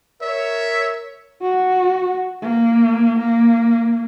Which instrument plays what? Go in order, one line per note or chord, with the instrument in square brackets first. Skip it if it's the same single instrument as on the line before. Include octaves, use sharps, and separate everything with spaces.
[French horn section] A#4 C#5 [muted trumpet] E5
[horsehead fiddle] F#4
A#3
A#3